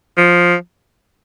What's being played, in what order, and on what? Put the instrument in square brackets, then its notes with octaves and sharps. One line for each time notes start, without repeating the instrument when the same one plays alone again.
[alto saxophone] F3